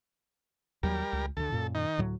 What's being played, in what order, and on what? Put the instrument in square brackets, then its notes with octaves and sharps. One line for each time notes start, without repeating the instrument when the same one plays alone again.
[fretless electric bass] D#2 F#3 [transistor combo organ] G3 A#4
[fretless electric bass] C#2
[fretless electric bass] D2 D3 [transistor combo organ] A4
[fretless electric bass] F#2 A#2
[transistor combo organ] D#3 D#4
[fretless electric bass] D2 A2 F#3